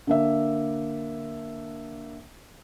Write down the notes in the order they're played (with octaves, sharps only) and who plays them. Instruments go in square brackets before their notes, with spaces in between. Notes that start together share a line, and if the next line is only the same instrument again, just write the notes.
[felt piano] D3 A#3 E5